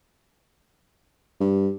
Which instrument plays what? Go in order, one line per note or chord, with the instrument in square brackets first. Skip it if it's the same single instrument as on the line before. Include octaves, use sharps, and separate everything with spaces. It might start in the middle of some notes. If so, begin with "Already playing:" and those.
[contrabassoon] G2